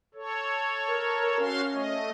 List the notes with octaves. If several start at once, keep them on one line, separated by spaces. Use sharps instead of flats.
A4 C#5
A#4
C#4 F#4 F5 C6
A3 D#5